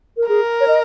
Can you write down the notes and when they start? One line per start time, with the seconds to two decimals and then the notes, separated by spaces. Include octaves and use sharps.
0.17 A#4
0.28 G#4 A#4
0.60 C#5
0.68 D#5